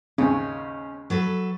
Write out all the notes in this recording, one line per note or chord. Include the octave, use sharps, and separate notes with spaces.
D#2 G#2 C#3 C#4
F#3 A4 B4